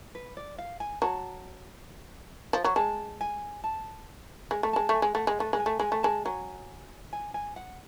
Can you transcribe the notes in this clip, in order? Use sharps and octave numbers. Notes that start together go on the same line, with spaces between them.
B4
D5
F5
G#5
F#3 A5
F3
F#3
G#3 A5
G#5
A5
G#3
A3
G#3 A5
A3 G#5
G#3
A3 F#5
G#3
A3 B4
G#3
G#5
A3
G#3 G#5
A3
G#3 A5
F#3 G#5
G#5
G#5
F#5